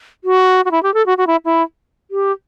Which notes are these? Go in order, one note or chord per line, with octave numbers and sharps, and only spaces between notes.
F#4
F#4
E4
G4
A4
F#4
F#4
E4
E4
G4